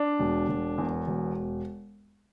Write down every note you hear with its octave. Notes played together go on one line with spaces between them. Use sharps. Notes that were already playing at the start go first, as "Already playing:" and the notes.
Already playing: D4
E1
E1
E2
E1